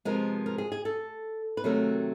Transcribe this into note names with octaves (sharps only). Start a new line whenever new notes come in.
C3 F3 G#3 B3 A#4
A#4
G#4
G#4
A4
B4
C3 D#3 F#3 A3 A#4